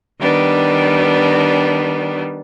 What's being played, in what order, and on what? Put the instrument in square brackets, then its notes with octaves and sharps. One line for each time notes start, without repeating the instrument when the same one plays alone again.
[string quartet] D#3 G3 B3 D4